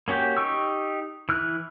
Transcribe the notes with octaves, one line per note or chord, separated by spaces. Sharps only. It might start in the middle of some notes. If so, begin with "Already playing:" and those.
A#3 C#4 F#4 G4 G5
D#4 G4 C#6 E6
E3 F6 F#6